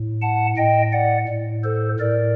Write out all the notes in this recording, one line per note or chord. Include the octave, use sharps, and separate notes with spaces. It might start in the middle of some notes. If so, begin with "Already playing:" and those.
Already playing: A2
F#5 A5
A2 D#5 G5
D5 F#5
A2
A4 C5
A2 A#4 D5